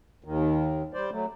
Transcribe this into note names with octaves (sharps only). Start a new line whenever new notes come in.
D#2 D#3
G3 C5 D5
F#3 A3